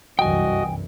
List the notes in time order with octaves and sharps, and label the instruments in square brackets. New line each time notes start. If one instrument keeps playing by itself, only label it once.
[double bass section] G1 F#2 E3 [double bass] C2 [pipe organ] F#4 D#5 [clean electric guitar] G5 G#5